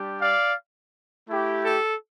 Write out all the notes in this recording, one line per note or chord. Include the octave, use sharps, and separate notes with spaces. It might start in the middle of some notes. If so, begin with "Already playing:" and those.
Already playing: G3 D4 G4
D5 F5
A3 E4 G4
A4